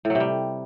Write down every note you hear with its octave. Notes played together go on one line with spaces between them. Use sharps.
A2
F#3
C3
G3